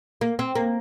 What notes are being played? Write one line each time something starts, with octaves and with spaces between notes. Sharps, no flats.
A#3
C4
A#3